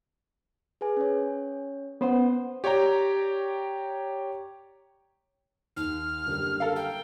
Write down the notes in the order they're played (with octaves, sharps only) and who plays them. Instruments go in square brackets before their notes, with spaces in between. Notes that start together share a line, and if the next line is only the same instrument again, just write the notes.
[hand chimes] G#4 B4 G#5
C#4 C#5
[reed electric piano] B3 B4 C5 [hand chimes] C#4 F#5
[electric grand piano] G4 C#5 D5 G5 A#5
[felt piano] D#2 [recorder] F6
[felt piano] F#1 D3 G3
[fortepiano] A4 A#4 F5
[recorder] G5